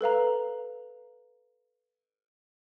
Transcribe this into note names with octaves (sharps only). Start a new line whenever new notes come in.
A4 B4 F5 A#5